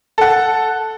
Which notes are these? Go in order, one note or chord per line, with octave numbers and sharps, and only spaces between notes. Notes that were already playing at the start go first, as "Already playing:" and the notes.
A4 F#5